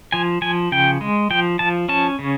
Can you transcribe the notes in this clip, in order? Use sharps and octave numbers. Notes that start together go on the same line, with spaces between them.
F3 G#5
F3 G#5
C#3 G5
G#3
F3 G5
F3 A5
C#4 A5
C#3